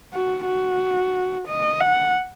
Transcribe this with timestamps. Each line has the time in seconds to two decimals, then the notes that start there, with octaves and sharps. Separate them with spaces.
0.13 F#4
0.47 F#4
1.48 D#5
1.81 F#5